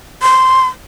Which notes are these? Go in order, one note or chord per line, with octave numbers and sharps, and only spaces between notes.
C6